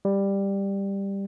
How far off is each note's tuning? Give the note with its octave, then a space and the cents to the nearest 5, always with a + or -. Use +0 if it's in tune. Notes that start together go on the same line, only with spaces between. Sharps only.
G3 +10